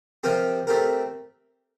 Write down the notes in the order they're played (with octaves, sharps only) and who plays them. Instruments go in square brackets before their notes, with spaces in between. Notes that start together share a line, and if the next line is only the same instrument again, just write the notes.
[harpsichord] C3 F3 C4 G4 A#4
A3 C4 G4 A#4